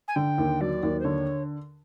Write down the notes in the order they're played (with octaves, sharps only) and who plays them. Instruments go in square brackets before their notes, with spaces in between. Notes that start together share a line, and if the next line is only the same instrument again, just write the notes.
[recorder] G#5
[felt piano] D3 [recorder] G5
[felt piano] D#2
[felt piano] F#3 [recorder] D5
[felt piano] D#2
[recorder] C5
[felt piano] D3 [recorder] C#5